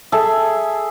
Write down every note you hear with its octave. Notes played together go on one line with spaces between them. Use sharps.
G#4 A4 E5